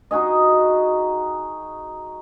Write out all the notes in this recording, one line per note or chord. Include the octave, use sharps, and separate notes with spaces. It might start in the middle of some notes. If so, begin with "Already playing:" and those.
D#4 F#4 G#4 D#5